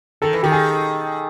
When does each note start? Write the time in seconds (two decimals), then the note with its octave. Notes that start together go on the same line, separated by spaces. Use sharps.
0.22 D#3 A4
0.33 E3
0.43 D#3 G4
0.52 G#4